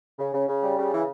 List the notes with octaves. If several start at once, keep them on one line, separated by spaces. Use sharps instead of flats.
C#3
C#3
C#3
G3
C#3
E3